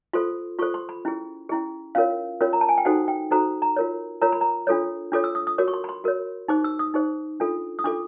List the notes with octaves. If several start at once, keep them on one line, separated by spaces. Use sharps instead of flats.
F4 A4 C5 C6
F4 A4 C5 C#6
C6
B5
C#4 E4 G#4
C#4 E4 G#4
C#4 F4 A#4 C#5 F5
C#4 F4 A#4 C#5
A#5
A5
G#5
G5
D#4 F#4 A4 C5 F#5
G5
D#4 F#4 A4 C5 A#5
A#5
F4 A#4 C#5
F4 A#4 C#5 A#5
B5
A#5
D4 F4 A4 C#5
D4 F4 A4 C#5 D6
E6
D#6
D#6
F#4 A#4 C#5 D6
C#6
C6
B5
C6
F#4 A#4 C#5
D#4 G#4 C5 D6
E6
D#6
D#4 G#4 C5
D4 F4 A4
D#6
D4 F4 A4 D6